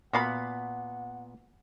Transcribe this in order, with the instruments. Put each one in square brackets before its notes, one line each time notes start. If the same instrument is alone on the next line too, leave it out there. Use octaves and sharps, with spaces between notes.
[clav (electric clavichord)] A#2 B3 [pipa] F#4 F5 B5 [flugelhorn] F#5